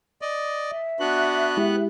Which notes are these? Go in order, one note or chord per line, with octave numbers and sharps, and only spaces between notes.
D5 D#5
E5
B3 D4 F#4 F#6
G#3 E4 G4